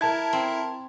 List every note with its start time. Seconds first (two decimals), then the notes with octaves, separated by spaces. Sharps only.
0.01 E4 A#4 A5 G#6
0.33 C4